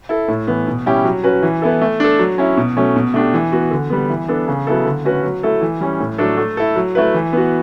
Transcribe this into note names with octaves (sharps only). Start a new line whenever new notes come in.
E4 A4
A2
E3 B3
B2
G3 C#4 E4 G4
F#3
C#4 F#4 B4
E3
B3 E4 A4
A3
D4 A4
F#3
C#4 E4
B2
F#3 A3 C#4
B2
A3 D4 G4
E3
B3 F#4
D3
G3 B3
E3
B3 D4 A4
C#3
F#3 B3 E4 A4
D3
A3 C#4 F#4 B4
F#3
A3 E4 A4
E3
G3 C#4
A2
F#3 A3 D4 A4
A3
E4 A4
F#3
A3 E4 B4
E3
B3 F#4